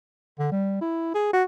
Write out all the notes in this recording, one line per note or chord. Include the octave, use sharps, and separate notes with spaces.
D3
G3
E4
G#4
F#4